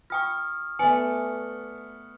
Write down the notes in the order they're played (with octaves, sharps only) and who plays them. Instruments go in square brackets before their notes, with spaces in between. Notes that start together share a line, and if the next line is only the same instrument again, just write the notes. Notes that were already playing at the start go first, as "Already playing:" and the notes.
[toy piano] F4 G5 [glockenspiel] C#6 D#6 F6
[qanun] A3 D5 [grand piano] B3 [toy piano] G#5 [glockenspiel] C#7